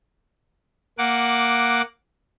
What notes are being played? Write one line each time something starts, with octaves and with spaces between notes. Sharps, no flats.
A#3 F#5 D6